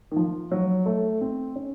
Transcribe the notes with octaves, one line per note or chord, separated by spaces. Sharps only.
D#3
F3
F#3
A3
C4
C#4